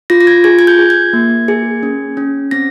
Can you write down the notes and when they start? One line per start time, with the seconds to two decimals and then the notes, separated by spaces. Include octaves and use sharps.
0.10 F4 A#6
0.21 A#6
0.27 G#6
0.44 G#4 G#6
0.59 G#6
0.67 G6
0.79 G#4
0.90 G#6
1.13 A#3
1.48 G#4
1.83 C#4
2.17 C#4
2.51 C4 A#6